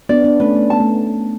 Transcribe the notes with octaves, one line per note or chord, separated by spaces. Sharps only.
B3 D4 D5
B3 D4
A3 C#4 B4
A3
B3 A5
A3